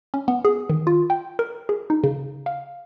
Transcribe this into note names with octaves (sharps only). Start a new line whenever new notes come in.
C#4
B3
G#4
D#3
F4
G5
A#4
G#4
D#4
C#3
F5